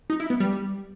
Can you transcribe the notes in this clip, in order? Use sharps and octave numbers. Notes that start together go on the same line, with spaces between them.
D#4
E4
B3
G3